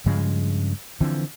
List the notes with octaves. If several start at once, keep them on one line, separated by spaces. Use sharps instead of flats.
G2 C#3 F3 G#3
D3 E3 F3 C4